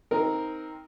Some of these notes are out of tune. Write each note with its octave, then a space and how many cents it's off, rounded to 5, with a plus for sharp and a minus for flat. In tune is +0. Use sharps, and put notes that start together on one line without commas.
C4 +0 D#4 +15 A#4 +0